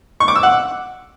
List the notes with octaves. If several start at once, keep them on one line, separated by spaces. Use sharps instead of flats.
C#6
D6
E6
F#5